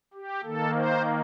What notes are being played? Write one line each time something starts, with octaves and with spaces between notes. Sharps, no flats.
G4
D#3 A#3 A4
C5